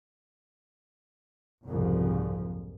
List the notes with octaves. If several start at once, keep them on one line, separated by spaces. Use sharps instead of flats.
F#1 C2 F2 G#2 F3